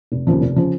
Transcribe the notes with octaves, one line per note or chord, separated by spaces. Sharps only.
F1
D#2 C#3 F3
F1
C#3 F3